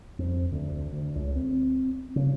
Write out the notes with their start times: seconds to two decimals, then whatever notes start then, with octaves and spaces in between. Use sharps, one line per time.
0.19 F2
0.51 D2
0.93 D2
1.16 C#2
1.36 C4
2.16 C#3